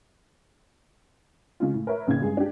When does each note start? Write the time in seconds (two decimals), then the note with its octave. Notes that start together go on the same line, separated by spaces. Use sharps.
1.60 C#3 G#3 F4
1.74 A2
1.87 A#4 B4 C#5 E5
2.07 A1 C#3 A#3 G#6
2.22 G2 G#3 G#4
2.37 D4 G4